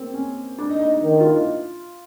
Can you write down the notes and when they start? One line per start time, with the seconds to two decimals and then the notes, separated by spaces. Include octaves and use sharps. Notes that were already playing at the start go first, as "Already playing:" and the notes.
Already playing: A#3 C4
0.14 C#4
0.59 D4
0.69 D#4
0.80 D#4
0.92 D#4
1.03 D#3
1.14 D#4
1.20 F4
1.25 E4
1.36 F4